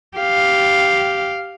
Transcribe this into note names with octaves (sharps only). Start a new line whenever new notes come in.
G4 F5